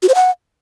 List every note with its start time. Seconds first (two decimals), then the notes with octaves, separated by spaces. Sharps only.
0.02 F#4
0.09 C5
0.15 F#5